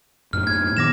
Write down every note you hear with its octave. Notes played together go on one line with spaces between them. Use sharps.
F#2 A2 F6
G#6
A#2 D#3 B3 D6 A#6 E7